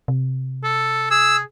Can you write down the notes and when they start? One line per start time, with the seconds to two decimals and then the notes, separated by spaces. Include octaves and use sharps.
0.08 C3
0.64 A4
1.11 G#4 E6